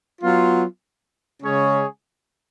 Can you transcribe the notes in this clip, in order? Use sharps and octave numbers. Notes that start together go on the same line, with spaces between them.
F#3 B3 F4
C#3 G#3 C#4 G#4 C#5